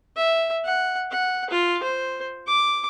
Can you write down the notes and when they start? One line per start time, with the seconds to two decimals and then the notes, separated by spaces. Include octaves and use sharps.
0.16 E5
0.65 F#5
1.11 F#5
1.50 F4
1.83 C5
2.47 D6